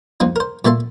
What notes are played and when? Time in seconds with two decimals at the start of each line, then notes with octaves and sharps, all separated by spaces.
0.20 F2 A#3 C4 D#4
0.36 A#4 C5
0.65 A#2 A3 A#3 E5 A5 C6